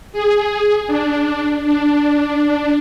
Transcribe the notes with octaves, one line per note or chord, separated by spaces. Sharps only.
G#4
D4
D4
D4